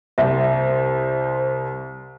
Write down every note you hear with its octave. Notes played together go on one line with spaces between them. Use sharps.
C2 C5 E5